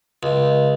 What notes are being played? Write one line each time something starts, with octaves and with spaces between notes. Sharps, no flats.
C#2